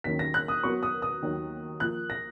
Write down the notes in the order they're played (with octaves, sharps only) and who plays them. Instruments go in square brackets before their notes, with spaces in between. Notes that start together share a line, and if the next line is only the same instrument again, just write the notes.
[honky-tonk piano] D#2 D#3 F#3 A#3 C#4 [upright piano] B6
[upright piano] A#6
F#6
D#6
[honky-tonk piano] F#3 B3 F#4 A#4 C#5 [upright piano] C#6
[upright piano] D#6
D#6
[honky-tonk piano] D#2 D#3 F#3
[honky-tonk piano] F3 A#3 F4 [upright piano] F#6
[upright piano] A#6